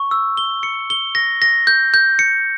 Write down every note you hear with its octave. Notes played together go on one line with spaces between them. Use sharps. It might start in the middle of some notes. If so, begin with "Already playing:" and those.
Already playing: C#6
E6
G7
C#7
G7
A#6
A#6
G6
G6
C#7